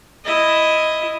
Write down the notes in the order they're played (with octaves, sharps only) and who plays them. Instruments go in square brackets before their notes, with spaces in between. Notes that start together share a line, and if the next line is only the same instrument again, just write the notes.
[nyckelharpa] E4 D#5